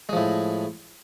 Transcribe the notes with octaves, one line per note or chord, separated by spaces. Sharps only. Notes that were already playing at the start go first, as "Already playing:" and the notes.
A2 F3 G#3